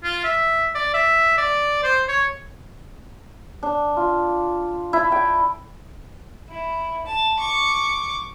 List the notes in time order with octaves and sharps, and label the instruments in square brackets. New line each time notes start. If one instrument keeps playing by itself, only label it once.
[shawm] F4
E5
D5
E5
D5
C5
C#5
[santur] D4
F4
E4
G5
[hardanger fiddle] E4
A5
C#6 D6